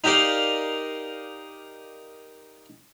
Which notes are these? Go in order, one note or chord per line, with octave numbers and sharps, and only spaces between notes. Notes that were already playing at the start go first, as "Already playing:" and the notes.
D#4 G4 A#4 D5 F5